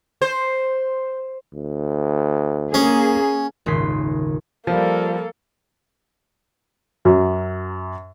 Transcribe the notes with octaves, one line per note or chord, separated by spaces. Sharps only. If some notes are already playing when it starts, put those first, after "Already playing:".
C5
D2
A#3 C#4 G#4
D#1 G#1 C#3 C6 B6
F3 G3 A#3 A4
F#2 F#3